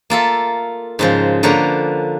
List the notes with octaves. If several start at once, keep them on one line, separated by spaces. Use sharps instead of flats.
A#3 F4 A4 E5
G#2 C#3 F3
D3 F3 A#3 B4 C#5 A#5